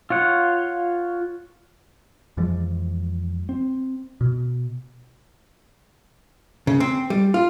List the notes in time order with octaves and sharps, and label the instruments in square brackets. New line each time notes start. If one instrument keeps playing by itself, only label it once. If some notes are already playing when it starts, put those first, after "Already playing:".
[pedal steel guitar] F4 C#5 F#5
[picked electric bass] F2 E3 F3 G#3
C4
B2
[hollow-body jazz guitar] C#3
C4
G3
F4